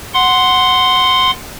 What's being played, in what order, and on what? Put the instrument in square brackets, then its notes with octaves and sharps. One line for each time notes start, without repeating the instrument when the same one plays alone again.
[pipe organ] F#5 C6